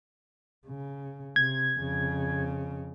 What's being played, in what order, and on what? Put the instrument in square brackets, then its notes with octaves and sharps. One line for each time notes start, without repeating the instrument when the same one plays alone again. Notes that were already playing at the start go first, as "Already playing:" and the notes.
[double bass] C#3
[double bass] C3 [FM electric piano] G#6
[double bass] F2 C#3